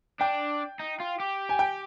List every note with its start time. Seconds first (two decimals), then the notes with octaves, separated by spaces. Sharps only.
0.21 D4 G5
0.80 D#4
1.00 F4
1.20 G4
1.49 G#5
1.59 G5